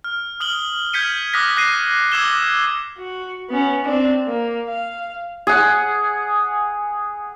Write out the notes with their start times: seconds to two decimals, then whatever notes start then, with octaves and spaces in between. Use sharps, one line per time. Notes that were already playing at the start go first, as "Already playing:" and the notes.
0.04 F6
0.40 D#6 F6 F#7 G7
0.93 F6 G6 G#6 B6 C#7 D#7
1.33 D6 D#6 F6 F#6 A#6 B6
1.56 D6 F#6 A#6 C7 D#7
2.12 D6 E6 G#6 E7 G7
2.98 F#4
3.50 B3 C#4
3.85 C4 D4
4.28 A#3
4.69 F5
5.47 G#4 F#5